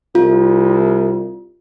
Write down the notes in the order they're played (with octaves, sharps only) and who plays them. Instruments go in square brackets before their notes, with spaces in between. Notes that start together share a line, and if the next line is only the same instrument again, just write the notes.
[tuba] C2 [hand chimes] F4